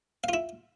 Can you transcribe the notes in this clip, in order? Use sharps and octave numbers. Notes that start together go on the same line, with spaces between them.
E4 F4 F5